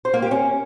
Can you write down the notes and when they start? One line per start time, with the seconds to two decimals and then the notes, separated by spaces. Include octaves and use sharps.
0.05 C5
0.14 A#3
0.22 G4
0.31 C#4